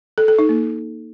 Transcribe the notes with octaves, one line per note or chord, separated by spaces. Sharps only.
A4
A4
D#4
A#3